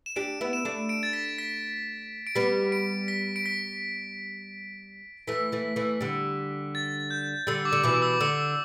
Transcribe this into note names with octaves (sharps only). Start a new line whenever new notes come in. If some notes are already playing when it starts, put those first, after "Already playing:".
E7
D4 G4 D7
B3 E4
E7
A3 D4
D7
A6
B6
B6
D7
G3 B3 B6
D7
B6
D7
B6
E3 A3 B6
E3 A3
E3 A3
D3 G3
A6
G6
D3 G3 E6
D6
D3
B2 E3 D6
E6
D6
D3 E6